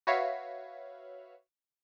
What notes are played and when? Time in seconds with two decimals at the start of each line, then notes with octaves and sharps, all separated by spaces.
0.07 F#4 B4 C#5 E5 F5